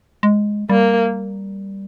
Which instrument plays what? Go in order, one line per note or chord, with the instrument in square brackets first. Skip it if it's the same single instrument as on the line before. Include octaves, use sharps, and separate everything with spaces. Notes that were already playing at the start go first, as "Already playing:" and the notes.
[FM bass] G#3
[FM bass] G3 [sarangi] A#3